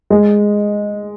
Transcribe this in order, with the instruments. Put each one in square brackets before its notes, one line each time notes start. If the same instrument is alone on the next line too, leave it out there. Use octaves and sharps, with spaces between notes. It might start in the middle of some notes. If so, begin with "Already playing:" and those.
[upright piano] G#3